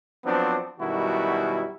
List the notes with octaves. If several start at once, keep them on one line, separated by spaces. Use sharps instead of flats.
F3 F#3 B3 C4 D4
F#2 B2 D#3 G3 E4 F#4